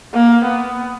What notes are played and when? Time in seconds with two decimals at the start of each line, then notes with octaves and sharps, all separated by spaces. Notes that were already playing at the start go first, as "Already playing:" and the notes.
0.14 A#3
0.44 B3